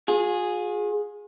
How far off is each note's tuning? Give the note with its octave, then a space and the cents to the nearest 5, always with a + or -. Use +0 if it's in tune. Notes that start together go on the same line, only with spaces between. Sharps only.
F4 +45 G#4 +0